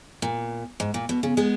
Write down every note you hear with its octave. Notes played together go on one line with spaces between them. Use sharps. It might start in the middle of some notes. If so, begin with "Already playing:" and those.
A#2
G#2
A#2
B2
C#3
G#3 B3